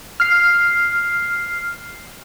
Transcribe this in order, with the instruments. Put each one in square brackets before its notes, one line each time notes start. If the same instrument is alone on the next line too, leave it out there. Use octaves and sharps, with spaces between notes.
[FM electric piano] F6 C7